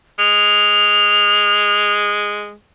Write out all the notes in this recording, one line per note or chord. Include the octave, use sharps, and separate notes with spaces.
G#3 F7